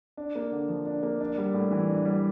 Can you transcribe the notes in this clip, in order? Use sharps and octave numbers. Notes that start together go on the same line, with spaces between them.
D4
A#3
D3
F3
D4
A#3
D4
G3
A2
E3
D4
G3